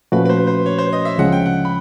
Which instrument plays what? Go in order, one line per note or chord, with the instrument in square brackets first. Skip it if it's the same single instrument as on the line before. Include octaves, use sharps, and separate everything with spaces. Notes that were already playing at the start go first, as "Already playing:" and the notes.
[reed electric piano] A#2 F3 A3 C#4 F#4 [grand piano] B4
[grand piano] B4
C5
C5
C#5
C5
D#5
E5
[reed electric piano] D2 C#3 F3 G#3 [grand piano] F#5
[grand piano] G5
F#5
B5